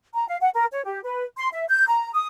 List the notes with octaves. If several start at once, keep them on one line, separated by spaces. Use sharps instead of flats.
A#5
F5
F#5
A#4
C#5
G4
B4
C6
E5
G6
A#5
D#6